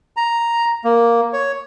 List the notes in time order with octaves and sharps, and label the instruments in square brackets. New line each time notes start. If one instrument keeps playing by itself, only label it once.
[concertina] A#5
A#3
C#5